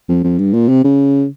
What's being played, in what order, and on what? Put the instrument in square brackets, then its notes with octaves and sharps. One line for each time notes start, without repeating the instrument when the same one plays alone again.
[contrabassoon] F2
F2
G2
A#2
C3
C#3